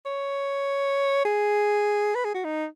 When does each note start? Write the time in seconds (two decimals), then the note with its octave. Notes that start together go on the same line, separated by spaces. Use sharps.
0.06 C#5
1.25 G#4
2.15 B4
2.24 G#4
2.34 F#4
2.45 D#4